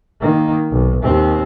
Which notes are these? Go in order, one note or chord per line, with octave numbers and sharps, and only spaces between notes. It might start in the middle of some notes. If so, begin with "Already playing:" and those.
D#3 A#3
B1
D#2 C4